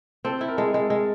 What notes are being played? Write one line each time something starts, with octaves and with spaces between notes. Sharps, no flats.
C4 A4
E4
A#4
G#3 A4
G#3
G#3